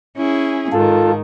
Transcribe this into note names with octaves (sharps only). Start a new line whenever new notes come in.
C#4 E4 G#4
G#2 D#3 F4 A4